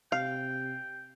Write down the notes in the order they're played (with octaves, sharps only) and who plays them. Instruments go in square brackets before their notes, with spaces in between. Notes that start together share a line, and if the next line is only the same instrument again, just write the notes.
[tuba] C3 [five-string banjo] F5 [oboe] G5